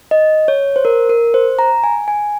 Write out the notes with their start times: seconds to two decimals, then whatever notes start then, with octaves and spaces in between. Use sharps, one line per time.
0.11 D#5
0.48 C#5
0.76 C5
0.85 A#4
1.09 A#4
1.34 C5
1.59 A#5
1.84 G#5
2.08 G#5